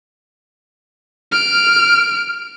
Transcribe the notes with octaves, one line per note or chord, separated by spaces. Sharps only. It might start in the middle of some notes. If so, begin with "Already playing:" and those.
F6 D7